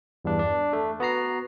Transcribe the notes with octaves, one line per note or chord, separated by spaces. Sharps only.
E2 G2 D4
D4
A3
B3 F#4 A#5 C7